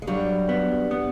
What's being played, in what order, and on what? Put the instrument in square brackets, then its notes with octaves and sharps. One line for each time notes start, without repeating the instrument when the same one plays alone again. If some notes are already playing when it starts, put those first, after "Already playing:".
[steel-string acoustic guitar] G#3
[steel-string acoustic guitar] G2 G3 [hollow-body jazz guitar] F#3
[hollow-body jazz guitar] B3
B3